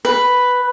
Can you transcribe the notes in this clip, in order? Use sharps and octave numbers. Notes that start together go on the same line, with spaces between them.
B4